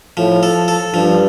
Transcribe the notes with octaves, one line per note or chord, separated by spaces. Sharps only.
A2 F3
A4
A4
G2 F3